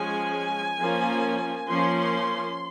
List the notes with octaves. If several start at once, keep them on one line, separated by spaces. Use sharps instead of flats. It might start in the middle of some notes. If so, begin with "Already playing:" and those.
Already playing: F3 G#3 C#4 G#5
F3 A#3 C#4
F3 A#3 C#4 C6